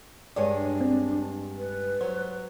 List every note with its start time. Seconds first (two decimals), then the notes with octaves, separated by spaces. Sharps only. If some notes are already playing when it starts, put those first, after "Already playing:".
0.36 G2 G#3 C#5 D5
0.55 D4
0.81 C4
1.58 B4
2.01 F#3 C5